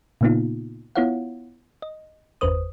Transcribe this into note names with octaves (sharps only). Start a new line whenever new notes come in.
A#2 C#3 A#3 B3 D#4 F4
B3 E4 F4 C#5 F5 F#5
D#5
G1 E2 B4 C5 D#6